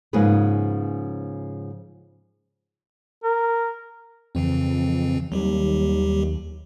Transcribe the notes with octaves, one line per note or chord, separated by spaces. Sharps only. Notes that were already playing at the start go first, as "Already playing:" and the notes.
G#2 C#3 F3 A#3 G#4 B4
A#4
F2 C#3 E3 C4
D#2 F#3 G3 G4